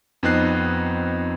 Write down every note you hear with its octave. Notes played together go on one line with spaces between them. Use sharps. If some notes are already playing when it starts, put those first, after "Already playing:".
F2 B3 C4 D#4 F#6 C7